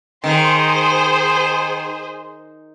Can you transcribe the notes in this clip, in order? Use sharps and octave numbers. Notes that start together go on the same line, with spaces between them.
D#3 G#4 C5 C6